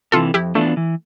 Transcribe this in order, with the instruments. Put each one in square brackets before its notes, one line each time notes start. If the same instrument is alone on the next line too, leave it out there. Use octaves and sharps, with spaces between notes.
[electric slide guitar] C3 E3 [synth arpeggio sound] F4 A4
[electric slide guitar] F2 [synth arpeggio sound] E4 G4
[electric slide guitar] E3 B3 D4 F4 [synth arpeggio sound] A3
[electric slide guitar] E3